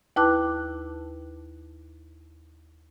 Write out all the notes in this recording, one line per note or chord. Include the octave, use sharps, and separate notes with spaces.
D#2 E4 B4 A5 D6 F#6